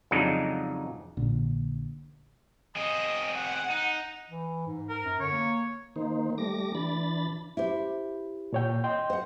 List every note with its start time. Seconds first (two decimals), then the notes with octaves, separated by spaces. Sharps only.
0.11 F2 C#3 F#3 G#3 D4 D#4
1.17 A#1 A#2 D3
2.76 C4 G#4 D#5
3.36 F#5
3.70 D#4
4.29 E3
4.67 G#2
4.89 A#4
5.04 F#2
5.20 D3 C#5
5.32 A#3
5.96 D#3 A#3 D#4 C5
6.38 G3 A3 D6 A#6
6.75 E3 D4 B5 A6
7.57 E4 G4 C5
8.53 A#2 C#5 G5
8.84 D#5 G5 C6
9.10 C5 F#5